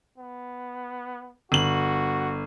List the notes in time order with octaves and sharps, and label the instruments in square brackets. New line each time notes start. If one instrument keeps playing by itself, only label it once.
[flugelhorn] B3
[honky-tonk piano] G1 F#7 [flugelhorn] F#4